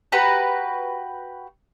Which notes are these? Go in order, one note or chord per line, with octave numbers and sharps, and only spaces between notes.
F#4 G4 B4 A#5